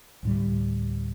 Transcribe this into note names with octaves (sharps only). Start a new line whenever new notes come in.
D2 A2 G3